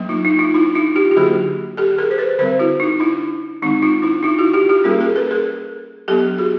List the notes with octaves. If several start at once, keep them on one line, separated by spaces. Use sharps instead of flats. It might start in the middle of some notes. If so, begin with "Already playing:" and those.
Already playing: F#3 A#3 D4
D#4 F4
D#4 F4
D#4 F4
D4 E4
D#4 F4
F4 G4
G4
D3 F#3 A#3 D4 F#4 G#4
G4 A4
G#4 A#4
C5
A4 B4
D3 G3 C4 A#4 C5
E4 F#4
D#4 F4
D4 E4
D#3 G#3 C4 D#4
D#4 F4
D4 E4
D#4 F4
E4 F#4
F4 G4
F4 G4
G3 A#3 C#4 G#4 A#4
G#4 A#4
A4 B4
G#4 A#4
F#3 B3 D4 G4 A4
F#4 G#4